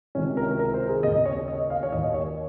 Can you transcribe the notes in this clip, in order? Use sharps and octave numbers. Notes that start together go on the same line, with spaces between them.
C#2 C3 D#3 C#4
A#4
A#4
C5
G#4
D#2 C#3 D#5
C#5
D#5
F5
C#5
D#2 D#3 D#5
C#5